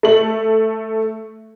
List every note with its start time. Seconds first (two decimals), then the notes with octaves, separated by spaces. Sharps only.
0.03 A3 F#7